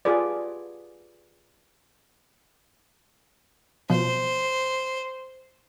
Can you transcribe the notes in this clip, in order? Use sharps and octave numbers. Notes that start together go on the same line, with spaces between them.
F4 G4 G#4 B4 D5
B2 F3 C5